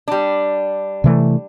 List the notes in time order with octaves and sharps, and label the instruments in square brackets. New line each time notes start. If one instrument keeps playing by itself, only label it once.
[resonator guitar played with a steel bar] G3 D4
[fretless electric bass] C3 E3 A3